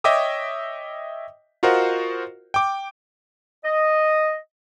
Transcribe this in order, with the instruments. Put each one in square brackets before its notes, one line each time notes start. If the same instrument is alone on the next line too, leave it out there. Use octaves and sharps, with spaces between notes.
[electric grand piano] C#5 D#5 E5 G5 D6 D#6
F4 F#4 A#4 C5 D#5 F#5
G5 D6
[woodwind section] D#5